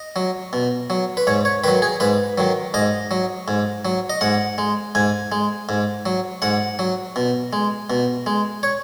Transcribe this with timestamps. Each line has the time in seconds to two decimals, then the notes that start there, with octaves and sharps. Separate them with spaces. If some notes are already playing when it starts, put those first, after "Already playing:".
Already playing: D#5
0.16 F#3
0.53 B2
0.90 F#3
1.17 B4
1.27 G#2 C#5
1.45 C#5
1.64 D#3 F#3 B4
1.82 G#4
2.00 G#2 B4
2.38 D#3 F#3
2.74 G#2 D#5
3.11 F#3
3.48 G#2
3.85 F#3
4.10 D#5
4.21 G#2 F#5
4.58 G#3
4.95 G#2 G#5
5.32 G#3
5.69 G#2
6.06 F#3
6.42 G#2 F#5
6.79 F#3
7.16 B2
7.53 G#3
7.90 B2
8.26 G#3
8.63 C#5